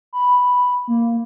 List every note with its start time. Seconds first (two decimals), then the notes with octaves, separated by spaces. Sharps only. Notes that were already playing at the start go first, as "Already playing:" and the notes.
0.13 B5
0.88 A#3